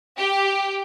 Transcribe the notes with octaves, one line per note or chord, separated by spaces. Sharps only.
G4